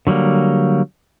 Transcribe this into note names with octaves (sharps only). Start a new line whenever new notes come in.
D3 F#3 G3 A#3